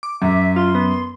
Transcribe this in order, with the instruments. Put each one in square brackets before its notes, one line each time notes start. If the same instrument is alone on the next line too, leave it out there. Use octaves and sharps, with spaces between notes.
[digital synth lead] D6
[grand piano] F#2 [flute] E5
[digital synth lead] F4 [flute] C6
[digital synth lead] B3